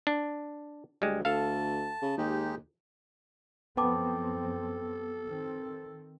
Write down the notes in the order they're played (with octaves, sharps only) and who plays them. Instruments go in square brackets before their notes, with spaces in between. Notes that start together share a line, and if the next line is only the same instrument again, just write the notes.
[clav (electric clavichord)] D4
[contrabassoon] D2 [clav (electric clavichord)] G3 G#3
[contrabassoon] D2 [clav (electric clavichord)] A4 F5 [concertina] A5
[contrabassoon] C#3
[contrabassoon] D#2 [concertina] G#3 D#4 G4
[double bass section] F#2 F3 C4 [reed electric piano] B3 [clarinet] A4 [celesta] G5 A5 D6
[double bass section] D#3 C4